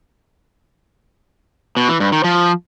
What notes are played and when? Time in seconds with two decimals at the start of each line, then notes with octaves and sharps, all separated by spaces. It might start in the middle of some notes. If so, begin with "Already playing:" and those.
1.77 B2
1.88 E3
2.00 G2
2.12 D#3
2.24 F3